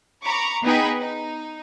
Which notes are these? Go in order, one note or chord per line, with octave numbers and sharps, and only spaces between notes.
A#5 B5 C#6 D6
B3 D#4 G#4 B4 G5 B5
D#4